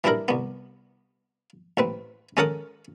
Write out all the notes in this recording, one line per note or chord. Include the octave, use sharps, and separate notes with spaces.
E3 G3 D4 E4 A#4
C2 B3
A1 C4 B4
G#3 C#4 A4 A#4 F#5 D#6